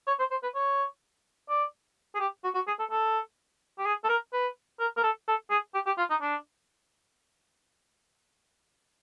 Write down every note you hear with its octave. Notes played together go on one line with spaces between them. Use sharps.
C#5
C5
C5
B4
C#5
D5
G#4
G4
F#4
F#4
G#4
A4
A4
G4
G#4
A4
A#4
B4
A#4
A#4
A4
A4
G#4
G4
G4
F4
D#4
D4